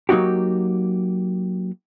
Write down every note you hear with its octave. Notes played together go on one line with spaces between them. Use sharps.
F#3 A#3 D#4 F#4 G4